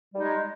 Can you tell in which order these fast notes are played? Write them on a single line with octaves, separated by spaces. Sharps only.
G3 D#4 G#3